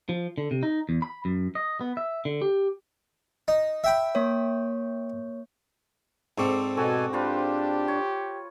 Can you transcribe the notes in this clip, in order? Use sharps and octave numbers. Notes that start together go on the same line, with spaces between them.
F3
D3
C3
D#4
E2
B5
F#2
D#5
B3
E5
D3
G4
D#4
E5 G5 B5
A#3 C#5
G#2 C4 A4 D5 C#6
B2 F#4 A4 G#5
D4 F4 G4 B4 C5
C#5